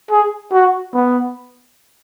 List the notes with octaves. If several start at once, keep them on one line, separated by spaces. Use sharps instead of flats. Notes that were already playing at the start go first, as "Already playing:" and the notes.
G#4
F#4
B3